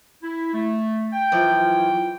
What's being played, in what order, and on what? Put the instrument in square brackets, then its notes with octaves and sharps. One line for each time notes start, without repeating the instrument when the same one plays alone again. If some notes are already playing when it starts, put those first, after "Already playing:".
[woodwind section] E4
A3
G5
[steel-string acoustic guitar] F#2 E3 F3